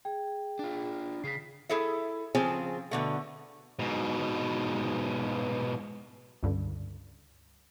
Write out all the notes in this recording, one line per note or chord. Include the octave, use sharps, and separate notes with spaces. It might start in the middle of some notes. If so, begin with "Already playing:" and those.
G#4 G5
D4 F4
C#3 G#4 B6 C7
E4 G#4 A4 E5
C#3 F3 C4 F4 G#4
B2 D3 A3
G#2 B2
C#2 G2 D3